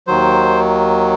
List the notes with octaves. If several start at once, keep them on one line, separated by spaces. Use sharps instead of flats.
D#2 D#3 F#3 C5